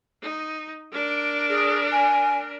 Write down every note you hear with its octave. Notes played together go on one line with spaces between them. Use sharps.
D#4
D4 A#4
G#4
G#5